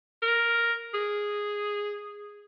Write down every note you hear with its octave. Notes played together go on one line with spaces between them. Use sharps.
A#4
G#4